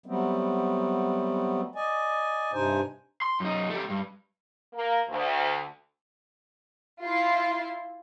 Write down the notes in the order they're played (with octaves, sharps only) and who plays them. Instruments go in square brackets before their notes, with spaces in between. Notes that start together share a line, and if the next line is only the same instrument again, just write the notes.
[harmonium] F#3 G3 A3 B3 C4
D5 D#5 G#5
G2 C3 D4 D#4 C5 G#5
[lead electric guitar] C6
F#2 D#4
A3 G4
G2
[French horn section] A#3
D2
[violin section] E4 F4 C6